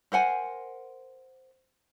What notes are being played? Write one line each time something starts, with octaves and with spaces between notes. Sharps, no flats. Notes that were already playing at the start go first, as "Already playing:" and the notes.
A#4 C5 F#5 G#5